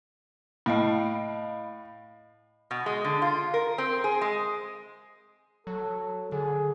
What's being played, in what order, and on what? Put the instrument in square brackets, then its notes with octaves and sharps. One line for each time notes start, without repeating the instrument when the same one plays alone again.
[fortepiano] A2 [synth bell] D#5 F5 B5
[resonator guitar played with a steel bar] B2
G#3
D3
F4
A#4
C4
G#4
G#3
[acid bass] F#3 [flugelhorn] A4
[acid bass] D3 [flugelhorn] G#4